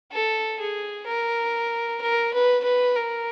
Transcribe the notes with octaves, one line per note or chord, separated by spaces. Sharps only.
A4
G#4
A#4
A#4
B4
B4
A#4